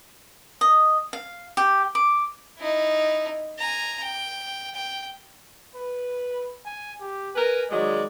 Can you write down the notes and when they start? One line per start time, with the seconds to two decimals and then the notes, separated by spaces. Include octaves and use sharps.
0.61 D#5
1.13 F5
1.57 G4
1.95 D6
2.58 D#4 E4
3.59 G#5 A#5
4.03 G5
4.75 G5
5.76 B4
6.66 G#5
7.02 G4
7.36 A#4 B4 G#5
7.70 D#3 F#3 G#3 D5